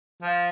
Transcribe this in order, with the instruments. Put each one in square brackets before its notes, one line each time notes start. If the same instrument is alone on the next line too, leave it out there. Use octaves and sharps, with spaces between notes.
[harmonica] F3